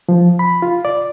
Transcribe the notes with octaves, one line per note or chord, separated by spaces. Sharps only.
F3
B5
F4
D5